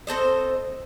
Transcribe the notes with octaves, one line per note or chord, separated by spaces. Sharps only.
C4 A4 C5 D#5